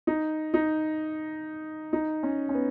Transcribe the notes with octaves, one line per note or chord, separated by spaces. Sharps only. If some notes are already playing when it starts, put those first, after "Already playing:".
D#4
D#4
D#4
C#4
C#4
B3